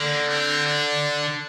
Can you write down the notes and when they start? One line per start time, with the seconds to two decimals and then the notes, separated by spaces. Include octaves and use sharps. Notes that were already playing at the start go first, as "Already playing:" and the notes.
Already playing: D3 A#3
0.28 C4
0.66 D4